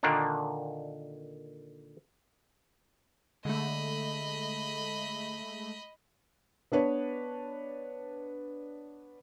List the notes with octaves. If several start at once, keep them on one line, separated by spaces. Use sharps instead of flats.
A#2 D3 D#3 A#3 D4 D#4
D3 G#3 A3 D#5 B5
B3 D4 B4 C#5